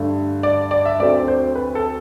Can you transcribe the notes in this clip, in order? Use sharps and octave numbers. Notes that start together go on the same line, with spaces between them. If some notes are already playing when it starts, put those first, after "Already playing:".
Already playing: G2 D3 A3
D5
D5
E5
D2 D3 F#3 A3 C4 D5
C5
B4
A4